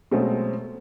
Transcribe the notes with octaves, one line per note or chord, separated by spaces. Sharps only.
B2 F#3 G#3 A3 C4 C#4